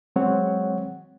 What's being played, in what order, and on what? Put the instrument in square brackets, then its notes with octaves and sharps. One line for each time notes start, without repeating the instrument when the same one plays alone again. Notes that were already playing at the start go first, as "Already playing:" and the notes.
[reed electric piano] F#3 G#3 C4 C#5 F#5